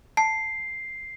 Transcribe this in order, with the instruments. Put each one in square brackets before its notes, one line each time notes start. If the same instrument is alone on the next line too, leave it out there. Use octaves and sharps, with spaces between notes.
[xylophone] A5 [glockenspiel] C7